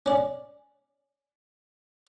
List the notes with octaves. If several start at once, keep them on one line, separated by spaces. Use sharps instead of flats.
C#4 D5